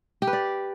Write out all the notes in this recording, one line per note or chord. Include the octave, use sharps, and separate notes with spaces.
G4
B4
D5